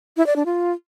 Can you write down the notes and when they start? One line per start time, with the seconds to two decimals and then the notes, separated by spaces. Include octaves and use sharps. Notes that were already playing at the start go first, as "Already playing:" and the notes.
0.17 E4
0.26 D5
0.36 D4
0.46 F4